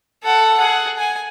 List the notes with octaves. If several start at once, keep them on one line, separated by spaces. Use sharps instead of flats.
A4 F#5
G#4 F#5
G#5